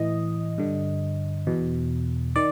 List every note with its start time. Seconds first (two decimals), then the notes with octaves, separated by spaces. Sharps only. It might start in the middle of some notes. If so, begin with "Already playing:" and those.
Already playing: A2 E3 D#5
0.58 G2 D3
1.47 E2 B2
2.36 D#3 D5